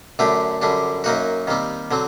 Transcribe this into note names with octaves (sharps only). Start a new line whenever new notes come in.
F#2 D3 A3 D4 G4
F#2 D3 G3 D4
F#2 F#3 A#3 D#4 F#4
D#2 D#3 G3 C4
D3 F#3 C4